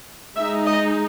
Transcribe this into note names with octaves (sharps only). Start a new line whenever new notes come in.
G#3 D#4 E5
D#5